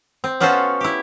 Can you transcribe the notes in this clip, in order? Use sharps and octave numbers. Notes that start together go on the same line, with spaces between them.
C4
B3 C#4 F4 F#4 A4 C5
E4 G4